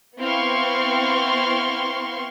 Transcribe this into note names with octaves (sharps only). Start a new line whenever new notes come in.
B3 C4 E4 F5 C6 C#6